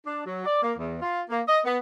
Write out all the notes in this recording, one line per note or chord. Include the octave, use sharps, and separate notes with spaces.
D4
F#3
D5
A#3
E2
F4
A#3
D#5
B3